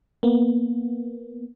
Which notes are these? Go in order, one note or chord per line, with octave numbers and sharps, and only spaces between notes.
A#3 B3